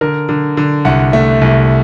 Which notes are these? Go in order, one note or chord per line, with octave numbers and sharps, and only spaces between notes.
D3 A#4
D3
D3
C2 F#5
A3
C2